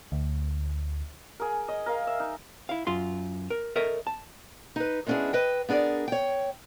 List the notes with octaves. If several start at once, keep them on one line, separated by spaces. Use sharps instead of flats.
D2
G#4 A#4
D#5
A#4 F5
E5
D#4
E4 F5
F#2 F4 C6
A#4
A4 A#4 C#5 D#5 E5
A5
D#4 B4
G#3 B3 C#4 D4 E4 G#4
B4 D#5 G5
B3 D4 G#4 A#4 D5
C#5 G5